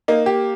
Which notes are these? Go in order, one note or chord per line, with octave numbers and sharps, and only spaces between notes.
A#3 D#4
G4